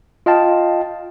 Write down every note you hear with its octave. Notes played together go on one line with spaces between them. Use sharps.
F4 D#5 F5 G5 A5